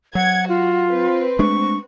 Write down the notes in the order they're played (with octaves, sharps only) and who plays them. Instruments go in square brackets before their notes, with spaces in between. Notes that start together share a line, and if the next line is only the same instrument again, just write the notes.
[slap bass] F#3 [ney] F#5 [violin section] G#6
[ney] F4 [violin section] F#4
[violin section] C4 B4
[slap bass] G#3 A3 D4 [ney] C#6